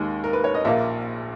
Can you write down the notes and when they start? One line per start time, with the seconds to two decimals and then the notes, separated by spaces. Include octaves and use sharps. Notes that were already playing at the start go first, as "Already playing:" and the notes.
Already playing: D#2 D#3 G#3
0.24 A#4
0.33 B4
0.44 C#5
0.54 D#5
0.65 A#1 A#2 A#3 E5